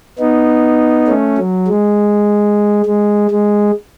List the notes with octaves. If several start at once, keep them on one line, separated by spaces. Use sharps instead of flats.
B3 D#4
A3 C#4
F#3
G#3
G#3
G#3